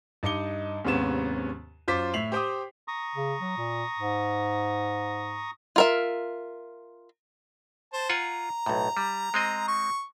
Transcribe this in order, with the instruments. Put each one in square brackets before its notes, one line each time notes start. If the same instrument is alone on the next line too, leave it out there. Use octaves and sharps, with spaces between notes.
[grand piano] G2 D#4 D#5 D6 C#7 G7
D#2 G#2 C3 B3 C#4 E7
F#2 F4 C5 D6 B6
A2 E5 C7 F7 F#7
G4 C5 G5 D6 D#6
[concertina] A#5 C#6 D#6
[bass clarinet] C#3
F#3
A#2
G#2
[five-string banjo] F4 A#4 E5
[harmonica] C5 A5
[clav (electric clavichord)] F4 F#5 G#5 [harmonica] A#5
[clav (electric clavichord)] B1 A2
G3
G#3 C4 D#5
[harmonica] C#6